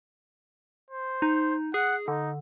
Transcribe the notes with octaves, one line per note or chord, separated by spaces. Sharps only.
C5
D#4
G#4 F#5
D3 D#4